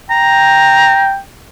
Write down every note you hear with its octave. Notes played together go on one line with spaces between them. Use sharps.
G5 A#5